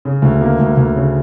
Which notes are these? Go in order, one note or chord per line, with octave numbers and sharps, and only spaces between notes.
C#3
D2
A#3
D2
D2
C#3